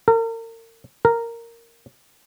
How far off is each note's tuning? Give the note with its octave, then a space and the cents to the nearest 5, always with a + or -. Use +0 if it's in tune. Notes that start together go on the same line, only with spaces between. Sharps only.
A#4 -40
A#4 -10